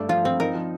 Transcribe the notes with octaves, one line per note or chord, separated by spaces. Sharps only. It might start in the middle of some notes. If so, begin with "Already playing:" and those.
Already playing: G2 A3 D5
F3 F4
F3 C4
D#4 A#4
F3